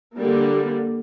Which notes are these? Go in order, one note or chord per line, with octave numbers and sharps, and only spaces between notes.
D3 G3 A#3